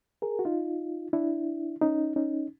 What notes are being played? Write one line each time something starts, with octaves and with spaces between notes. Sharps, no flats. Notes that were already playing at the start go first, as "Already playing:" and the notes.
G#4 A#4
F#4
D#4 F4
D4 E4
C#4 D#4
C#4 D#4